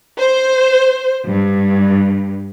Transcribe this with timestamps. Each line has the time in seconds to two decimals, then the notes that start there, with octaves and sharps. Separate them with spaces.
0.19 C5
1.28 G2